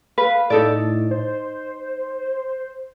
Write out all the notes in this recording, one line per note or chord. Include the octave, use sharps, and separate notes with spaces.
B4 F5
A2 D#4 A4 D5
C5